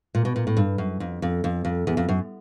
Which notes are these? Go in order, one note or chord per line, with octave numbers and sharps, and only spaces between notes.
A#2
B2
A#2
A2
G2
F#2
F2
F2
F2
F2
E2
F2
F#2